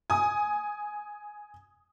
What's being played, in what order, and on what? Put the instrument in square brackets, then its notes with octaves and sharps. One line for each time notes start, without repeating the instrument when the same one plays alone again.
[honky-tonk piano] G#5 D#6